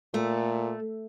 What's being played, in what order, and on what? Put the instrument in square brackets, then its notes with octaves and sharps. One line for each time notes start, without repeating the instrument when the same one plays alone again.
[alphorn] A#2 [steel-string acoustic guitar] A3